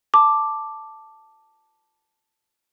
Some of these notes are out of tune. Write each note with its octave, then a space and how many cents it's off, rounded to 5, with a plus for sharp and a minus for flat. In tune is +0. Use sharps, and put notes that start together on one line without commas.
A5 +0 D6 +0